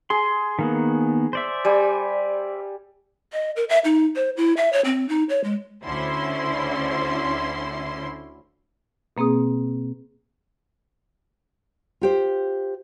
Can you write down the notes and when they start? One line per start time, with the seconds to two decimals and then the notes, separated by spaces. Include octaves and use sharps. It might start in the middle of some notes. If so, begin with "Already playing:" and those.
0.10 G#4 C6
0.59 D#3 A#3 B3
1.33 C5 D5 E5
1.65 G3 G#5
3.33 D#5
3.56 A#4
3.69 E5
3.85 D#4
4.16 C5
4.37 E4
4.57 E5
4.73 C#5
4.85 C4
5.09 D#4
5.29 C#5
5.44 G#3
5.85 D2 D3 C#4 E4 C5 C6
9.17 B2 A#3 C4 G#4 D#6
12.01 F4 G4 C5